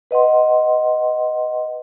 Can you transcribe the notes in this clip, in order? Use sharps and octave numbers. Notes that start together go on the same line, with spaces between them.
B4 D#5 F#5 C6